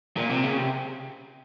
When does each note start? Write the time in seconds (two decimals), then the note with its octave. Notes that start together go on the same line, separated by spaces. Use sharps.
0.17 A#2
0.30 C3
0.43 C#3
0.57 C3